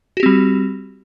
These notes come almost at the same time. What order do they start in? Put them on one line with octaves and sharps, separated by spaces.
F#4 G4 C4 G3